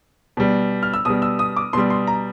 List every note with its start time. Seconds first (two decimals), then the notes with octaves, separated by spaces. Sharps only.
0.37 B2 G3
0.83 F6
0.94 E6
1.05 B2 G3 D#6
1.22 E6
1.39 D#6
1.56 D6
1.73 B2 G3 C6
1.90 C6
2.07 A#5